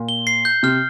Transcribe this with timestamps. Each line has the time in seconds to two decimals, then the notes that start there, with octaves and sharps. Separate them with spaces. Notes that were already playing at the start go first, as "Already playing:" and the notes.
Already playing: A#2
0.09 G7
0.27 C7
0.45 G6
0.63 C3 F6